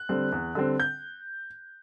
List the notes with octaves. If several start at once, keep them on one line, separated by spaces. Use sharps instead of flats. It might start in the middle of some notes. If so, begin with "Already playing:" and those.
Already playing: F#6
D3 G3 C4
E2
D3 G3 C4
G6